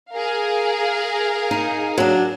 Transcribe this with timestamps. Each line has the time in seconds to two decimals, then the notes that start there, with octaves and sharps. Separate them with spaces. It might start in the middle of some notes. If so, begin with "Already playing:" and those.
0.11 G#4 A#4 F5
1.51 D#4
1.98 F#3 D4